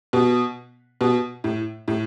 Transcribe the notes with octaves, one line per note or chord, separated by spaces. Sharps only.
B2
B2
A2
A2